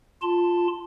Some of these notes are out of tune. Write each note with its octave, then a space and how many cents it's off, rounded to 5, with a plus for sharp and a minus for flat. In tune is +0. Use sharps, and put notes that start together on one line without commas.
F4 +0 A5 +0 C6 -20